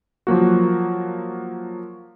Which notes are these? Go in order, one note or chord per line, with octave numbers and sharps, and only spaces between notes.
F3 F#3 A#3 F#4